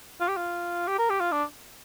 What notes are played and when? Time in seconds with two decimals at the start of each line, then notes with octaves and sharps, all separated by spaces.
0.20 F4
0.28 G4
0.37 F4
0.88 G4
0.99 A#4
1.10 G4
1.20 F4
1.32 D4